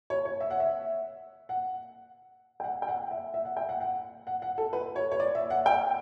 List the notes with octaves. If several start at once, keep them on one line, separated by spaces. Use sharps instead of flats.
C#5
C#5
E5
F#5
E5
F#5
G5
F#5
G5
F#5
E5
E5
F#5
G5
F#5
F#5
F#5
F#5
A4
B4
C#5
C#5
D5
E5
F#5
G5